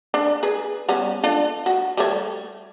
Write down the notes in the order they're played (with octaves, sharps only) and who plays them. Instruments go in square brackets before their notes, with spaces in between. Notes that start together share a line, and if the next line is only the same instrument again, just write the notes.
[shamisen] D4
G#4 B4
G3 B3 C#4
D4 F4 A4
F#4
G3 A3 C#5